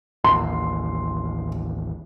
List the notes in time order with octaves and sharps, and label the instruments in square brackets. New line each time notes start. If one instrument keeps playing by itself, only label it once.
[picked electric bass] A1 D#2 [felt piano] C6